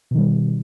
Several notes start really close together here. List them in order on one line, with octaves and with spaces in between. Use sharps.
B2 D#3 G3